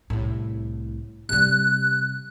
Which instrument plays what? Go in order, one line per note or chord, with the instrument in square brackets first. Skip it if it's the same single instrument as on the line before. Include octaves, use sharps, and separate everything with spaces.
[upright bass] C2 A2
[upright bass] C3 G3 [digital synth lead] F#6